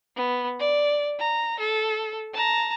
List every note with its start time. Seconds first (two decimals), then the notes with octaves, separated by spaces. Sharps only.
0.16 B3
0.59 D5
1.19 A#5
1.59 A4
2.34 A5 A#5